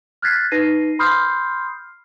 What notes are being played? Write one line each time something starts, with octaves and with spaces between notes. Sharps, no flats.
F6 F#6 G#6 A6 B6 C7
D#4 B4 A#6 C7 D#7
B5 C6 D#6 F6 G6 C7